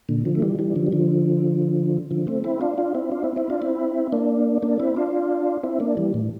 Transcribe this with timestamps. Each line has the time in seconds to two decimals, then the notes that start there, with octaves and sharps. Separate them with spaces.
0.09 A#2 D3
0.25 D3 F3
0.35 A3
0.42 E3 G3
0.59 E3 G3
0.76 D3 F3
0.87 G3
0.92 D3 F3
2.11 D3 F3
2.27 A3 C4
2.44 C4 E4
2.61 D4 F4
2.78 D4 F4
2.95 C4 E4
3.11 D4 F4
3.24 C4 E4
3.36 C4 E4
3.50 D4 F4
3.62 C4 E4
4.12 A#3 D4
4.62 A#3 D4
4.80 C4 E4
4.96 D4 F4
5.63 C4 E4
5.80 A#3 D4
5.97 E3 G3
6.14 A2